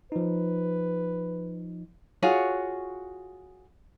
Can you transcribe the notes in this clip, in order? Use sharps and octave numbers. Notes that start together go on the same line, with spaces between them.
F3 D#4 B4
F4 F#4 G#4 C#5